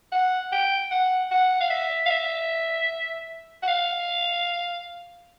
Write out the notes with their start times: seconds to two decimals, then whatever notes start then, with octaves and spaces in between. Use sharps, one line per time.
0.12 F#5
0.52 G5
0.91 F#5
1.31 F#5
1.60 F5
1.70 E5
2.06 F5
2.10 E5
3.63 F#5
3.68 F5